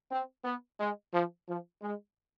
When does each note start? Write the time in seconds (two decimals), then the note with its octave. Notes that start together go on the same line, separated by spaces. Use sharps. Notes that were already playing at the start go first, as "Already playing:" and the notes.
0.11 C4
0.45 B3
0.80 G#3
1.13 F3
1.48 F3
1.82 G#3